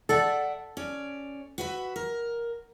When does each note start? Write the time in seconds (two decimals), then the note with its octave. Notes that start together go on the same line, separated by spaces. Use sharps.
0.09 A4 D5 E5 F#5
0.77 C#4 D5
1.58 F#4 B4 E5
1.96 A#4